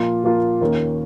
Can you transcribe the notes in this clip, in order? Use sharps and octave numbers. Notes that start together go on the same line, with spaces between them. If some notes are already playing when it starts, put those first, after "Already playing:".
Already playing: A#2 F3 A#3 F4
A#2 F3 A#3 F4
D#2 D#3 A#3 C#4